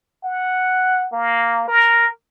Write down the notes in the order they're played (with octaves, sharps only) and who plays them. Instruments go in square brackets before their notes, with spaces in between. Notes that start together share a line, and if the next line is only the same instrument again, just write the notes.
[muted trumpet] F#5
A#3
A#4